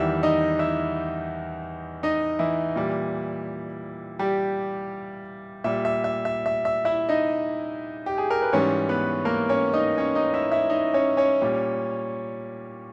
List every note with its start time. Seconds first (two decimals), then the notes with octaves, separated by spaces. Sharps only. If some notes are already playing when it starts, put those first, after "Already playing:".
Already playing: E2 D#3 G3 E4 E5
0.23 D#4 D#5
0.59 E4 E5
2.03 D#4 D#5
2.39 E3 E4
2.76 A#2 G3
4.19 G3 G4
5.64 A#2 G3 E5
5.85 E5
6.04 E5
6.25 E5
6.46 E5
6.65 E5
6.85 E4 E5
7.09 D#4 D#5
8.06 G4
8.18 G#4
8.30 A#4
8.42 B4
8.53 G#2 E3 G3 C#4 C#5
8.89 B3 B4
9.25 A#3 A#4
9.49 C#4 C#5
9.73 D#4 D#5
9.98 C#4 C#5
10.15 D#4 D#5
10.34 E4 E5
10.52 E4 E5
10.70 D#4 D#5
10.94 C#4 C#5
11.17 C#4 C#5
11.42 A#2 G3